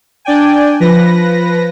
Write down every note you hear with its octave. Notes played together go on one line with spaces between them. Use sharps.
D4 D5 G5 G#5
F3 B4 A#6